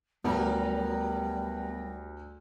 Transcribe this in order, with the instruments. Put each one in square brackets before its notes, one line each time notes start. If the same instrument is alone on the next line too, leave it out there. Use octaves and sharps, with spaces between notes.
[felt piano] D2 [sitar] F#3 D#4 A#4 [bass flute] G3 [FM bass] B3